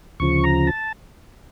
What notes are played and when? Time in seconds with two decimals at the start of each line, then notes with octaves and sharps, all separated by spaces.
0.20 D2 C#3 F3 C#6
0.44 A#5
0.67 A5